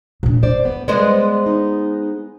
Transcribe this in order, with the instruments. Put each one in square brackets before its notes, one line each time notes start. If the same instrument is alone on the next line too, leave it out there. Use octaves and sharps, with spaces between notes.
[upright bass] A#2 D4
[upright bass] E4 [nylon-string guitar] C5 D5
[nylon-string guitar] B3
[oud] G#3 B3 C5 [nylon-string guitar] D5 D#5
[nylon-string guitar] D#4